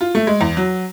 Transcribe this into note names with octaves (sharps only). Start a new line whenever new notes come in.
F4
A3
G#3
E2
F#3